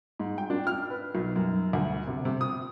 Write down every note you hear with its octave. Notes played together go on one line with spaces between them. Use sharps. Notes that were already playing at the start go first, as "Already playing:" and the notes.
G#2
G5
D4
F6
B4
B1
F#2
D2
C3
C3
D#6